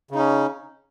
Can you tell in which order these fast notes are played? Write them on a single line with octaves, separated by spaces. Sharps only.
C#3 D#4 C#4